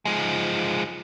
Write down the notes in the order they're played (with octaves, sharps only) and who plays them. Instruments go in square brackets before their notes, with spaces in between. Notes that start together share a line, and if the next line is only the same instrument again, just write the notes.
[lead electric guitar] F3 G#3